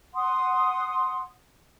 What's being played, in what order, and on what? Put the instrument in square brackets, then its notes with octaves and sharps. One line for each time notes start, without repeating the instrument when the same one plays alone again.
[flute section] F#5 C6 D#6